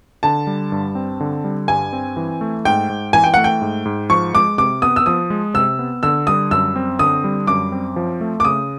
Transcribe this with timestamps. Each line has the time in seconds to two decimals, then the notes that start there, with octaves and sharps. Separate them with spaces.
0.23 D3 A5
0.47 G3
0.72 G2
0.95 C4
1.20 D3
1.44 G3
1.68 G2 G#5
1.93 C4
2.17 E3
2.41 A3
2.65 G#2 G5
2.90 G#2
3.13 E3 G#5
3.24 G5
3.34 A3 F#5
3.44 G5
3.61 G#2
3.85 G#2
4.10 F3 C#6
4.34 G#3 D6
4.58 C3 D6
4.82 B3 D#6
4.96 E6
5.06 F3 D#6
5.30 G#3
5.54 C3 E6
5.79 B3
6.03 D3 E6
6.27 G3 D#6
6.51 F#2 E6
6.76 C4
6.99 D3 D#6
7.24 G3
7.47 F#2 D6
7.72 C4
7.96 F3
8.21 A3
8.40 D6
8.45 C#3 D#6